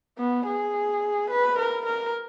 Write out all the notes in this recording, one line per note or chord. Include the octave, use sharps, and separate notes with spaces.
B3
G#4
B4
A#4
A#4